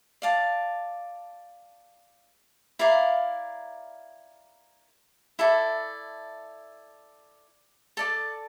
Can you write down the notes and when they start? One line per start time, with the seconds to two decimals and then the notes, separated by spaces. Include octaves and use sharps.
0.22 D5 F5 A5
2.79 E4 A#4 D5 F5
5.39 E4 A4 D5
7.97 A4 D5 A5